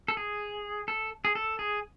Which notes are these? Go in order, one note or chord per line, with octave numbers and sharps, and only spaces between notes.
A4
G#4
A4
G#4
A4
G#4